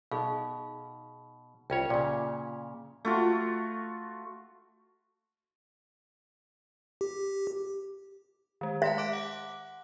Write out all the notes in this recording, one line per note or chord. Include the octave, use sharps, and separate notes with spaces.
B2 D#4 G#4 F5
C2 C#4 F4 C#5 G5
A#2 C#3 D5
A3 F4 F#4
G4
D#3 G#3
E5 A5 C6 B6
D6 F#6 D7
F#5